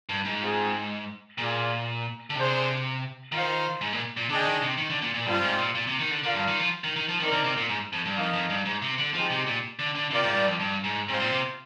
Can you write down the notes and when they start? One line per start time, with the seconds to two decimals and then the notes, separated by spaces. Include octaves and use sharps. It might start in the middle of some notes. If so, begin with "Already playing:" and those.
0.09 G2
0.25 G#2
0.42 C4 F4 G#4
1.38 A#2 F4 G#4 D5 F5
2.30 D3
2.35 C3 D4 G#4 C5
3.32 D#3 F4 C5 F5
3.81 G#2
3.93 A#2
4.17 A#2
4.29 D3 D4 G#4 D#5 G5
4.45 D#3
4.62 C3
4.77 D#3
4.90 D3
5.02 A#2
5.14 A#2
5.26 G2 G3 C4 F4
5.42 G#2
5.58 A#2
5.75 A#2
5.87 C3
5.99 D#3
6.11 D3
6.24 D3 F4 A#4 D5 F5
6.35 G2
6.48 D#3
6.59 F3
6.84 D#3
6.96 D#3
7.09 F3
7.20 D#3 C4 D#4 A#4 D5
7.32 D3
7.44 C3
7.57 A#2
7.69 G#2
7.93 F2
8.06 G2
8.17 F2 D#4 A#4 F5
8.33 F2
8.50 G2
8.65 G#2
8.82 C3
8.98 D3
9.14 F3 G#3 C4 D#4 G4
9.30 C3
9.47 A#2
9.79 D3
9.95 D3
10.11 C3 F4 A#4 D5 G5
10.24 G#2
10.36 G2
10.47 F2
10.60 G2
10.84 G#2
11.08 G#2 C4 F4 C5
11.20 A#2
11.32 C3